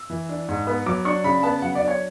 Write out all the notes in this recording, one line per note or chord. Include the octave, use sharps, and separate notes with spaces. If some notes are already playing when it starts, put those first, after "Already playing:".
Already playing: E6
E3
D4
G#2
B3
F#3 D6
D4 C#6
C#3 B5
B3 A5
F#3 F#5
D5
D4
C#5